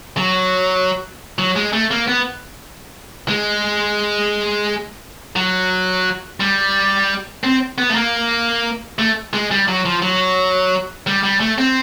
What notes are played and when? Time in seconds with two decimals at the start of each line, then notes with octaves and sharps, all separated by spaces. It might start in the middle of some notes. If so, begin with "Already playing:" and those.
0.17 F#3
1.39 F#3
1.56 G#3
1.73 A3
1.91 A#3
2.08 B3
3.28 G#3
5.36 F#3
6.40 G3
7.44 C4
7.78 B3
7.90 A3
7.96 A#3
8.99 A3
9.34 G#3
9.51 G3
9.68 F#3
9.85 F3
10.02 F#3
11.07 G3
11.23 G3
11.40 A3
11.58 C4